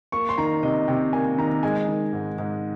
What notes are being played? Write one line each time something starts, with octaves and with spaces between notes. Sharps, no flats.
A#3 C#6
C6
D#3 A#5
C3 D#5
C3 G5
A#3 G#5
D#3 A#5
G#3 G#5
D#3
G#2
G#2